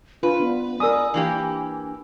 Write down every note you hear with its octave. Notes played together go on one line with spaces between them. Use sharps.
D4 F4 B4
B3 D4
A#4 D5 G#5 D#6 E6
E3 A#3 D4 G4